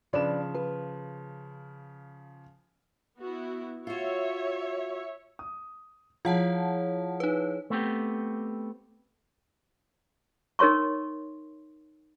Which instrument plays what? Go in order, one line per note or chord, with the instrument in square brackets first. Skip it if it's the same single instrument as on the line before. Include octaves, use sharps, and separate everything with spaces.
[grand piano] C#3 F3 E7 [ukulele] D4 B4 D5
[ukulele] B4
[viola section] B3 E4 F#4
[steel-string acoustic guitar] F4 F#4 [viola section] C#5 E5
[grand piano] D#6
[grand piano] F3 [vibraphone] E4 G#4 C#5 [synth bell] F4 F#5 A5
[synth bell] D#4 B4
[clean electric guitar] A3 B3 C4 G4
[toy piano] D#4 A#4 C#5 C6 C#6